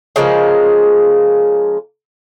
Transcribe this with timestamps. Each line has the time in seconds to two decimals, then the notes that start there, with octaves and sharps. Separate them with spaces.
0.16 C#3 F3 G#3 A#3